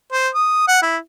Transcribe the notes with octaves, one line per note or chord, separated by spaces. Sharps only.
C5
D#6
F#5
E4